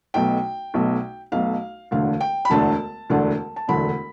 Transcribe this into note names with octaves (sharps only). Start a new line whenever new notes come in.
B1 B2 A3 G5
B1 B2 A3
B1 B2 A3 F5
E1 D2 D3 A3 D4 F5
G5
B5
E1 D2 D3 A3 D4 A5
E1 D2 D3 A3 D4
A5
E1 D2 D3 A3 D4 B5